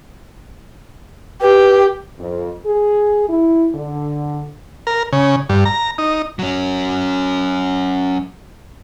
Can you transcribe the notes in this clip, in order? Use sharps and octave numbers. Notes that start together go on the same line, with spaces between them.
G4 B4
F2
G#4
E4
D3
A#4
C#3
G2
A#5
D#4
F#3 C#4